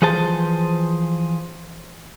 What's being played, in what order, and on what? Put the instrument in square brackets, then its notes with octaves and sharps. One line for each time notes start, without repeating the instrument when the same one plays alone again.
[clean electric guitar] E3 F3 G#4 C5 A5